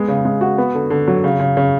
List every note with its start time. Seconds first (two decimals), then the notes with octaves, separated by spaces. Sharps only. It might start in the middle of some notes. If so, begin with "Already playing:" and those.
Already playing: G#3 B3
0.08 C#3
0.25 G#3
0.41 F#4
0.58 B3
0.75 D3
0.90 D3
1.08 F#3
1.24 C#3
1.40 C#3
1.57 C#3